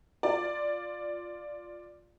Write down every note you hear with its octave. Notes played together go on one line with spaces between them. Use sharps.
F4 D5